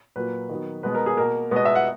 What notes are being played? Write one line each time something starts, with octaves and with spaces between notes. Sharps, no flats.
A#2 F#3 A#3 B4
D#3 F#3 B3
B2 G#3 B3 B4
A#4
G#4
B2 A#3 A#4
B2 G#3 B3 D#5
E5
F#5